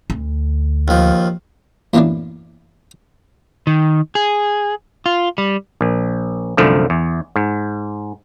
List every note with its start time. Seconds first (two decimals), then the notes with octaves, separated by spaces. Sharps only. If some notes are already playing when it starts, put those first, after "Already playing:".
0.10 D2
0.88 D#2 F3
1.94 F#2 A2 E3 A#3 B3 D4
3.67 D#3
4.15 G#4
5.06 F4
5.38 G3
5.81 A#1
6.57 C2 F#2 D3 F3 A3
6.90 E2
7.36 G#2